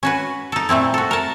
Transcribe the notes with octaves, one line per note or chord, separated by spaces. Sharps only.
C#4 F#4 B4
D#4 A4
A#2 A3 C4 E4
F#4 A4
A#4 A5